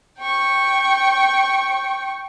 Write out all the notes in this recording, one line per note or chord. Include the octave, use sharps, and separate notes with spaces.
G5 C#6